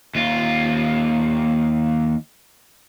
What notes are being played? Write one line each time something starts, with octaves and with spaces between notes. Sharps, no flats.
D#2 F4